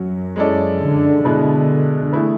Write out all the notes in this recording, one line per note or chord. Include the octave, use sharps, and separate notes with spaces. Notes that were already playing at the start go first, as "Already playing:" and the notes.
Already playing: F#2 F#3 C#4 F#4
G#3 C#4 E4 A4 D5
D3
B2 D3 G#3 B3 E4 B4
E3 A3 E4 G#4 B4